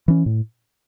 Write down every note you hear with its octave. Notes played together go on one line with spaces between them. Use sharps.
E3 C#4
A2